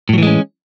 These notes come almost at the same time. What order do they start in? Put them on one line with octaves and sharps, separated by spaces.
A2 F#3 E3 G#3 C#4